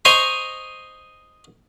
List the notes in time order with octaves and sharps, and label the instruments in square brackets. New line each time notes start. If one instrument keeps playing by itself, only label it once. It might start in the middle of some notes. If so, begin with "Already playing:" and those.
[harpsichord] C5 D#5 G#5 A#5 C6 C#6